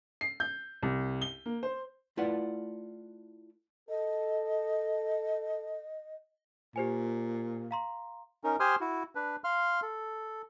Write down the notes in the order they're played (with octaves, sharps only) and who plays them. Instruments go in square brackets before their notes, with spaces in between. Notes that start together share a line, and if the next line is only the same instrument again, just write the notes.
[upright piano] C7
G6
C2
G7
A#3
C5
[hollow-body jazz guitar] A3 E4 F4 B4 D5 F#5
[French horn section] A4 [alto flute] D#5
[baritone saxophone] A#2 [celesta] G4 C5 G#5
[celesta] F5 A#5 C6
[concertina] C#4 D#4 A#4
G4 C5 G#5 C6 D#6 F6
E4 F#4
D4 B4
F5 C6 F6
A4